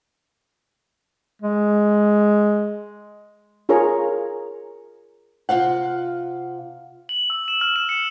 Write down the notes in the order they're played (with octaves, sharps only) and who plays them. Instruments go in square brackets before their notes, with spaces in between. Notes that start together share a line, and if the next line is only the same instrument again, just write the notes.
[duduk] G#3
[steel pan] F4 G#4 A#4 C#5 A#5
[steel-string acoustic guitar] C3 F4 F5 F#5
[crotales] F#7
E6
E7
F6
E7
C#7